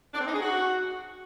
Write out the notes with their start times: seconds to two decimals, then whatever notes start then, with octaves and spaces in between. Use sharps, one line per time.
0.14 D4
0.21 C4
0.27 D#4
0.34 G#4
0.41 F#4